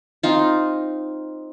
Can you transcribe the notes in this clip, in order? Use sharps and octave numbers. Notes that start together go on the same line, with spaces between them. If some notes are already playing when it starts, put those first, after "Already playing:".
C4 D#4 F4